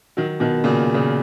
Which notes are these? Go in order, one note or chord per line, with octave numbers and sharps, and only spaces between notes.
D#3 F#3
B2 D#3
A#2 C#3
A#2 C#3